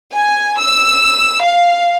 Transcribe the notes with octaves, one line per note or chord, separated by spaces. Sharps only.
G#5
E6
F5